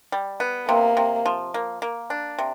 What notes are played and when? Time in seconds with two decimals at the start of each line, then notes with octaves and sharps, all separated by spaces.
0.12 G3
0.40 B3
0.68 C3 A#3
0.97 C3
1.26 F3
1.54 A#3
1.82 A#3
2.10 D4
2.39 C3